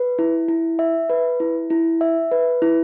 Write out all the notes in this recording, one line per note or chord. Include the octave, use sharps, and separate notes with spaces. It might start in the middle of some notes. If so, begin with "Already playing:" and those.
Already playing: B4
E4
E4
E5
B4
E4
E4
E5
B4
E4